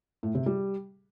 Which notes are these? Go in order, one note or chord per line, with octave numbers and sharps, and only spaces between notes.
A2
C3
G3